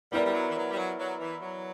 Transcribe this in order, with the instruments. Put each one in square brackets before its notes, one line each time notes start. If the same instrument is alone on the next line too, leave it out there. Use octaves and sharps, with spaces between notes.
[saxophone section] G3 [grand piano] B3 E4 A#4 D5
[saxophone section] G3
F#3
E3
F#3
G3
F#3
F#3
E3
F#3